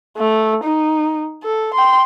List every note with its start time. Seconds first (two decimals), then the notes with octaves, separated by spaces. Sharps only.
0.18 A3
0.64 D#4
1.43 A4
1.74 G5 C6